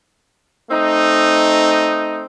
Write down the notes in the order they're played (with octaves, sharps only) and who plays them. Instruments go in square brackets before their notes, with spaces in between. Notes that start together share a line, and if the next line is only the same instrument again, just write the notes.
[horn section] A3 C4 D#4